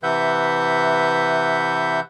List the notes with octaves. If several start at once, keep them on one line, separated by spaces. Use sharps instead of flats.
C3 E3 B4 E5 F#5 G6